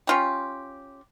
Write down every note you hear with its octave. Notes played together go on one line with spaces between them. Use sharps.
C#4 F4 G4